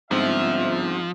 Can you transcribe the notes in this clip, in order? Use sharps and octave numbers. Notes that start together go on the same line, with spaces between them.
G1 G#2 F3 C4 E5